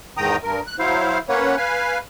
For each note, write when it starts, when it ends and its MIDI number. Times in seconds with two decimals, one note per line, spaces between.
0.17 0.36 40
0.17 0.36 44
0.17 0.36 51
0.17 0.36 79
0.17 0.36 82
0.17 0.36 87
0.43 0.61 43
0.43 0.61 70
0.66 0.75 90
0.79 1.18 54
0.79 1.18 64
0.79 1.18 72
0.79 1.18 77
1.29 1.56 58
1.29 1.56 61
1.29 1.56 71
1.29 1.56 73
1.29 1.56 78
1.57 1.98 71
1.57 1.98 77
1.57 1.98 80